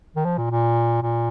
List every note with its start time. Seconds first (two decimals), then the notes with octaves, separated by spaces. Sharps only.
0.16 D#3
0.25 F3
0.38 A#2
0.51 A#2
1.03 A#2